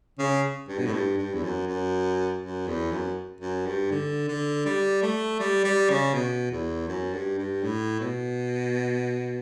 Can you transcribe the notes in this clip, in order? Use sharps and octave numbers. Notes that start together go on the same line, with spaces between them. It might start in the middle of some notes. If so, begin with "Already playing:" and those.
C#3
G2
B2
A2
G2
G2
E2
F#2
F#2
F#2
E2
F#2
F#2
G2
D3
D3
G3
A3
G3
G3
C#3
B2
E2
F#2
G2
G2
A2
B2